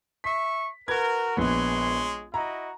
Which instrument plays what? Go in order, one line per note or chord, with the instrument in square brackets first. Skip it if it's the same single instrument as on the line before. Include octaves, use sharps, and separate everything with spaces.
[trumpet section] E5 C#6 [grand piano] B6
[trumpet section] F#4 A#4 [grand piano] B4 G#6
[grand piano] A#1 B3 [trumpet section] G#3 C#5 C6
[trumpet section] E4 F#4 D#5 [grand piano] A#5